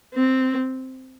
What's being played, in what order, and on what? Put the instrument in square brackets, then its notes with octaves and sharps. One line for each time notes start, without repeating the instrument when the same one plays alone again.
[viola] C4